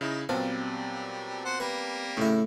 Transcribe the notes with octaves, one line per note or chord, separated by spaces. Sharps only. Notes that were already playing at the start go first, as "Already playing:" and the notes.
C#3 D#4 E4
A#2 F#3 G3 B3 C4 F5 A5
C5 F#5
G3 A#3 B4
A2 C#3 E4